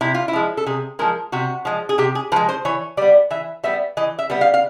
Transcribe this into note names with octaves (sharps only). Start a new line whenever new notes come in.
C3 E4
F4
E4
F3 G#3
A4
C3 G#4
F3 G#3 A#4
C3 F#4
F3 G#3
G#4
C3 G4
G#4
F3 G#3 B4
C5
E3 C#5
G3 B3 D5
E3 E5
G3 B3 E5
E3 D#5
E5
G3 B3
F5
F5